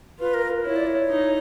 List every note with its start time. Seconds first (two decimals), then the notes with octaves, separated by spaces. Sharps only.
0.19 F4 B4
0.34 A#4
0.65 E4 C#5
0.76 D5
0.87 C#5
1.10 D#4